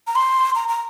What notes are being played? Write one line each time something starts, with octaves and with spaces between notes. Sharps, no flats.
A#5
C6
A#5
A#5